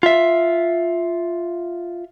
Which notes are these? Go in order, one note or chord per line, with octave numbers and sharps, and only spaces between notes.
F4 E5